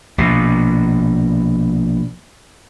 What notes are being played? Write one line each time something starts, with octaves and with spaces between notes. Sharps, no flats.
A#1 B2